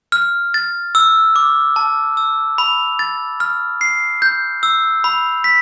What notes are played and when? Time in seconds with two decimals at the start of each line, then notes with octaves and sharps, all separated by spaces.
0.12 F6
0.54 A6
0.95 E6
1.36 D6
1.76 A5
2.17 E6
2.58 B5
2.99 A6
3.40 F6
3.81 C7
4.22 G6
4.63 E6
5.04 B5
5.44 B6